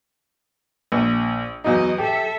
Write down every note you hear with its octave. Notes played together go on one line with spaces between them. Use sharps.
A#1
E2 F#3 D#4 D#5
G4 A4 E5